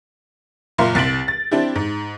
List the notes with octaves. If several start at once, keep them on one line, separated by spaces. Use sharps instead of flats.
F#1 A#2 E5 F5 A#5 C6
C2 A6 B6 D7 F#7
A6
C4 D4 E4 G4
G#2